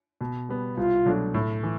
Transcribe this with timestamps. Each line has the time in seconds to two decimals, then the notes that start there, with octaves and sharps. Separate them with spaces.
0.21 B2
0.49 G3 B3
0.77 C2 F4
1.06 B2 F#3 A3 D4
1.34 A2
1.63 E3